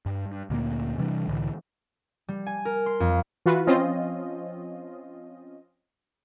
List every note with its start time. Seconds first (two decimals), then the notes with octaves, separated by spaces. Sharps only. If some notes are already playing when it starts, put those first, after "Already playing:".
0.06 G2
0.26 G2
0.50 D2 A#2 G#3 A#3
0.98 C3 E3 G3 D4
1.28 C2 A2 D3 E3
2.28 G3
2.46 G#5
2.65 A#4
2.86 C6
3.00 F2
3.46 E3 F4 F#4 B4
3.67 F3 C4 C#4 F4 D#5